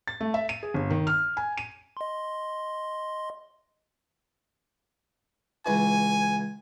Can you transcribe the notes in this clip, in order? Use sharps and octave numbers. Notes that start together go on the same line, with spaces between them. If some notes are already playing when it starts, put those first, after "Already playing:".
A6
A3
E5
D#7
G#4
G1
D#3
F6
G#5
D#7
D#5 C6
C#2 E3 G#5